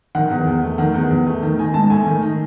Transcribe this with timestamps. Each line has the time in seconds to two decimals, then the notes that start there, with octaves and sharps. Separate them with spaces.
0.15 D#3 F#5
0.30 E2
0.46 E2
0.63 A3
0.78 D#3 F#5
0.94 E2
1.10 E2
1.26 A3
1.43 D#3
1.59 D#4 G#5
1.74 G#2 A5
1.90 A3 G#5
2.06 D#3
2.22 D#4